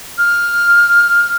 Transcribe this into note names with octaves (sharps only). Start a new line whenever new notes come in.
F6